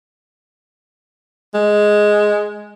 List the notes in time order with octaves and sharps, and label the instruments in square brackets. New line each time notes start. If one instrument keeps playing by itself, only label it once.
[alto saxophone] G#3